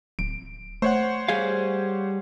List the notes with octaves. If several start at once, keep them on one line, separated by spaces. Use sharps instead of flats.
D1 D7
A3 C5 C#5 F#5
G3 G#4 F5